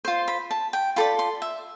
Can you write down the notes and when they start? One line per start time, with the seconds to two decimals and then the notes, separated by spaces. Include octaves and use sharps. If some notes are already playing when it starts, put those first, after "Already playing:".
0.05 F4 C5
0.28 B5
0.51 A5
0.73 G5
0.96 F4 A4 D5 B5
1.19 C6
1.42 E5